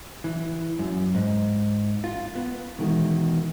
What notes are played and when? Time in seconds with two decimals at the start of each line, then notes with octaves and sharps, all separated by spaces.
0.24 E3
0.79 F#2
1.15 G#2
2.04 F4
2.35 B3
2.78 B2 D#3 E3 G#3